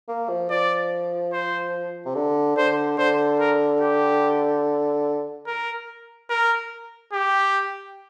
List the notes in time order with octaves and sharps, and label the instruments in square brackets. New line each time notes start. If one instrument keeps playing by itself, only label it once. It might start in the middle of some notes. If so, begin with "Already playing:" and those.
[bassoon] A#3
F3
[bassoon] F3 [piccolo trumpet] D5
[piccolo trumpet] C5
[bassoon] C3
D3
[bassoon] D3 [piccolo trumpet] C5
[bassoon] D3 [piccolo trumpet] C5
[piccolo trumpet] A#4
G4
A#4
A#4
G4